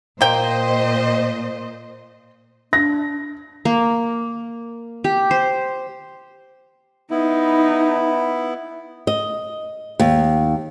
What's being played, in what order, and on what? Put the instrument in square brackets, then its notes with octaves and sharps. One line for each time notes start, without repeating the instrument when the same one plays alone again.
[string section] A#2 C5 D#5 [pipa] A#3 G5
[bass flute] D4 [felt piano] A#6
[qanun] A#3
G4
C5
[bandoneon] B3 E4 [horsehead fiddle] D#4
[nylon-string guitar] D#5
D#2